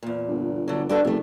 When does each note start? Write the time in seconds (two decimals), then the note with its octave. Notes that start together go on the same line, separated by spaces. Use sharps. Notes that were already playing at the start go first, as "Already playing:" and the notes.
0.03 E2 A#2
0.28 G1
0.68 D3 F#3
0.89 G2 D4 F#4 A4
1.05 F#1 C3 A3